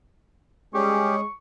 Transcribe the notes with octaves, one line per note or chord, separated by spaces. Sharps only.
G3 G#3 C#4 G4 G#4 C#6